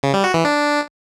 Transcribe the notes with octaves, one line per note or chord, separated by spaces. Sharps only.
C#3
G3
F#4
E3
D4